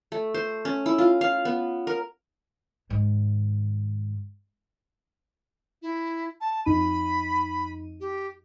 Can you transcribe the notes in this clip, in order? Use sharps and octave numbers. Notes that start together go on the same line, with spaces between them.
A3
C5
C#4
E4
F4
F5
B3
A#4
G#2 D#3
E4
A5
F2 D#4 B5 D#7
G4